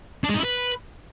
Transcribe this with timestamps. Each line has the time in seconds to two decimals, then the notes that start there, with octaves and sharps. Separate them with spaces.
0.24 D4
0.29 G#3
0.34 D#4
0.39 E4
0.44 B4